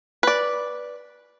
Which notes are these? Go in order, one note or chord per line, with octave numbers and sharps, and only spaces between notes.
B4 D5